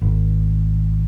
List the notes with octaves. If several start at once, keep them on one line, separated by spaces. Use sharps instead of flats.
G#1